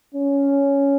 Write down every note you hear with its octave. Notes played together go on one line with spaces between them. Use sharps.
C#4